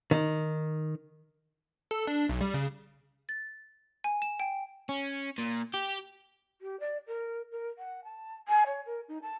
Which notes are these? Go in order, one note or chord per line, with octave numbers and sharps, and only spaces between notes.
D#3
A4
D4
B1
G3
C#3
A6
G#5
E7
G5
C#4
A#2
G4
G4
D5
A#4
A#4
F#5
A5
G#5
C#5
A#4
D#4
A5